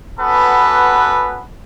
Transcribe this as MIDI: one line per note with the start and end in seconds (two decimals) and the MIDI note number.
0.20 1.45 59
0.20 1.45 61
0.20 1.45 66
0.20 1.45 69
0.20 1.45 71